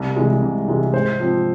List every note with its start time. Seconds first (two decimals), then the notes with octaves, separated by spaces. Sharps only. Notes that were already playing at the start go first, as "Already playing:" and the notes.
Already playing: C2
0.16 C3 E3 G#3
0.42 C2
0.68 C3 E3 G#3
0.93 G#2 C5
1.20 F3 C4